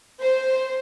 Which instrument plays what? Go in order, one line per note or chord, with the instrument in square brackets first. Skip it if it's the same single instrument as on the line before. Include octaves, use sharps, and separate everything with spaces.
[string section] C5